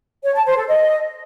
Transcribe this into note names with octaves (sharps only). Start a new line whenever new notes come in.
C#5
A5
C5
A4
D#5